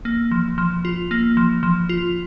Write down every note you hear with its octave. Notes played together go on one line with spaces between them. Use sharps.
A#3
F3
F3
F4
A#3
F3
F3
F4